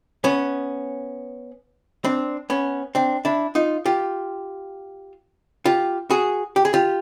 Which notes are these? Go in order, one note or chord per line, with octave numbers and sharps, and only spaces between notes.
B3 C#4
C4 D4
B3 C#4
C4 D4
D4 E4
D#4 F4
F4 G4
F4 G4
F#4 G#4
G4
G#4
F4 G4